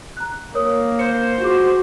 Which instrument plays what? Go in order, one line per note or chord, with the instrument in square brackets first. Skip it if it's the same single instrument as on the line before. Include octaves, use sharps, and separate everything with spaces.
[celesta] A#5 F#6
[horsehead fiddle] A#3 [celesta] A#4 C#5 D#6
[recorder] C5 [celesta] C#7
[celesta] F4 G#4 D6 [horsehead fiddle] F#4